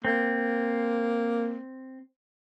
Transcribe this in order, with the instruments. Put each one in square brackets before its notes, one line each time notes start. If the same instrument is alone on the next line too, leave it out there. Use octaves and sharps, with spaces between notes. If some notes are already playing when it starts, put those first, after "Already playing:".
[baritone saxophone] A#3 [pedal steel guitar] C4